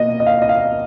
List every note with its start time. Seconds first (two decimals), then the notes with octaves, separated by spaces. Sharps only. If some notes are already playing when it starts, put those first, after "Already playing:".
Already playing: B2 A#3 D#5
0.20 D#5
0.27 F5
0.42 D#5
0.49 F5